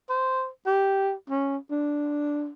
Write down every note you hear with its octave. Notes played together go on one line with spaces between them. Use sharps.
C5
G4
C#4
D4